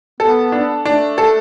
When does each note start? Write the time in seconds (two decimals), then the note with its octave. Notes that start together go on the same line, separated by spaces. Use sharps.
0.20 B3 A4
0.52 D4
0.85 A3 D4
1.18 A4